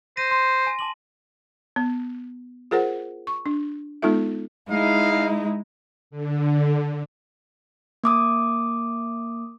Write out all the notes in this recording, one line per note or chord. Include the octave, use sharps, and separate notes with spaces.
C5 A#6 D#7
C6 A#6
G#5
A5 D6 F#7
B3
F4 G#4 A#4 C5 F#5
C#6
D4
G#3 B3 D#4 F4 A4 E5
G#3 D#4 E4 F5
D3
A#3 D6 D#6